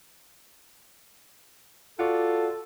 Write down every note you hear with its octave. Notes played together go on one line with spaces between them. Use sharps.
F4 F#4 A4 D5 F#5